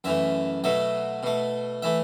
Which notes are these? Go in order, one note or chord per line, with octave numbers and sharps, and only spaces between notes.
F#2 E3 A3 E5
B2 F#3 A3 E5
B2 A3
E3 A3 E5